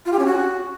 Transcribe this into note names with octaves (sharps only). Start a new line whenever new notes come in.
F4
G4
C#4
F#4